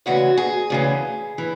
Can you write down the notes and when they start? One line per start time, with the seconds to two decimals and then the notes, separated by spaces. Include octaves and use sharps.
0.06 D2 C#3 E3 F#4
0.37 G#4
0.70 D2 C#3 E3
1.38 E3